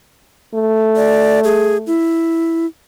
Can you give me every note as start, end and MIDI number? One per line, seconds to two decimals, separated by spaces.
0.54 1.97 57
0.96 1.40 74
1.44 1.77 68
1.87 2.66 64